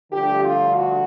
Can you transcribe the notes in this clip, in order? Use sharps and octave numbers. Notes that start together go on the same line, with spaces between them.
G2 D3 F3 A3 G4
F4
F#4